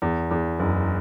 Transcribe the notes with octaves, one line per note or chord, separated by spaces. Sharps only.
E2
E2
F#1